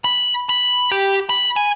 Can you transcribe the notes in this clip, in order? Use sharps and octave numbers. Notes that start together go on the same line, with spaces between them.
B5
B5
G4
B5
G#5